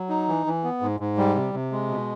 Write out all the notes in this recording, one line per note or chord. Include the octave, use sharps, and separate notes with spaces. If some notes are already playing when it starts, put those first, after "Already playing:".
Already playing: F#3
D#4
E3
E3
B3
G#2
G#2
G3
C3
C3
G#3
B2